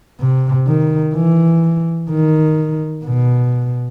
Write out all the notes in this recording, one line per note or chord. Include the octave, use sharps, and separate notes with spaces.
C3
D#3
E3
D#3
B2